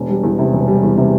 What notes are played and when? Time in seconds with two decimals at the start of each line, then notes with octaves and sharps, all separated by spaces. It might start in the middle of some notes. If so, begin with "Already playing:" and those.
Already playing: E1
0.09 G3
0.23 E2
0.39 C3
0.53 E1
0.68 G3
0.83 E2
0.97 C3